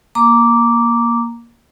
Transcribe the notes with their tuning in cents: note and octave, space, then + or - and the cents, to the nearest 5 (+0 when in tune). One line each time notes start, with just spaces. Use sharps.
A#3 +10 A#5 +0 D6 -10